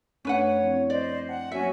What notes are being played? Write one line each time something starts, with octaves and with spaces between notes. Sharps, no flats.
F#2 A3 C#4 D4 B4 C#5 F#5
F3 C4 E4
C5 D5 D#5
F#5 G5 A5
F#3 A#3 C#4 F#4 E5 G#5